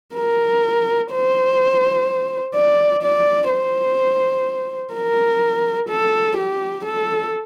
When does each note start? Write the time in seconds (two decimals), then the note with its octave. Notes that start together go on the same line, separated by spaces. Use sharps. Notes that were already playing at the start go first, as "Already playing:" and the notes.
0.15 A#4
1.12 C5
2.54 D5
3.02 D5
3.50 C5
4.93 A#4
5.89 A4
6.38 G4
6.85 A4